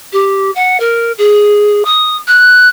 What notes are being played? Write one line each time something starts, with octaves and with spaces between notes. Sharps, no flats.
G4
F#5
A#4
G#4
D#6
F#6